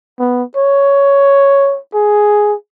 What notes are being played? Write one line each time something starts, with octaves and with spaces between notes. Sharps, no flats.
B3
C#5
G#4